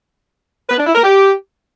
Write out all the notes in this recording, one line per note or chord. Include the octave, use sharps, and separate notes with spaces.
B4
D4
E4
A#4
G4